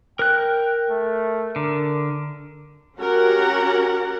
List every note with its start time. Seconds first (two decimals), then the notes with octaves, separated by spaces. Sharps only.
0.19 A#4 G5 F#6
0.90 A3
1.56 D3 A#4
2.98 C#4 F#4 G4 A#4 F#5 A#5